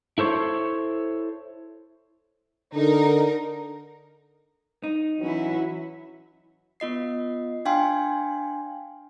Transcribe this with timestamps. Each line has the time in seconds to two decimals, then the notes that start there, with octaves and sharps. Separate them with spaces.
0.18 E4 A4 C5 C#5
2.75 D3 D#4 A#4
4.84 D#4
5.20 E3 F#3 C#4 E4
6.80 B3 F4 D#5 C7
7.65 D4 F5 G5 G#5 C6